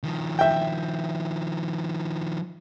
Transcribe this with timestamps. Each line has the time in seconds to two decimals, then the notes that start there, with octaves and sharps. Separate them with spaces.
0.03 D#3 F3
0.39 E5 G5